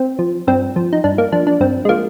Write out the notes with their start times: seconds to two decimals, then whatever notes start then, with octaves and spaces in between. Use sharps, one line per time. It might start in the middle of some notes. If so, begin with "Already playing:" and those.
Already playing: C4
0.19 F3
0.47 G2 C4
0.76 F3
0.93 D#4
1.04 G2 D4
1.18 A#3
1.32 F3 D4
1.47 D4
1.61 G2 C4
1.85 G#3
1.89 F3 A#3